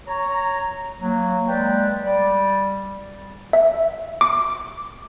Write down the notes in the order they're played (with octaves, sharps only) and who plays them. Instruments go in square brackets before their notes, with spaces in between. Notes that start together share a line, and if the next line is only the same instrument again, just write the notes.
[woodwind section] C#5 A#5
F#3 A#3
G#3 A#3 B4 D5 G5
G3 D5
[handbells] E5
D6